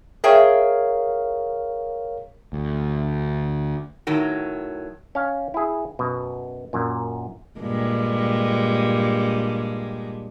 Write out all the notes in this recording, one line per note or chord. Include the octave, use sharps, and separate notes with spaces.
G#4 A#4 C#5 E5 F5 G5
D2
A2 D#3 F#3
C#4 F5
E4 G#4
F#2 B2
F#2 A#2
G2 A#2 G#3